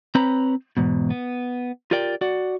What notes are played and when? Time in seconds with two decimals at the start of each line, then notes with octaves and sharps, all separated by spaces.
0.15 C4 B4 C#5 A#5 B5
0.77 E2 G#2 B2
1.10 B3
1.91 F4 G4 A#4 D5 G5
2.21 F#4 D5 F#5